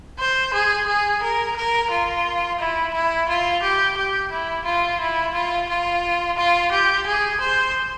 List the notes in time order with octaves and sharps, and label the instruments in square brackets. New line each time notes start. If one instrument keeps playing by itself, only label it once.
[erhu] C5
G#4
G#4
A#4
A#4
F4
E4
E4
F4
G4
G4
E4
F4
E4
F4
F4
F4
G4
G#4
C5